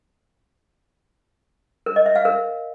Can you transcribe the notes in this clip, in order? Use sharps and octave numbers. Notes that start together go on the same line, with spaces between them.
A#4
D#5
E5
F5
A#4